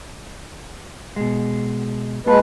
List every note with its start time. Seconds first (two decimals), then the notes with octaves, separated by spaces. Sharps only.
1.16 B2 G#3
2.27 G#3 A#3 F4 B4 A5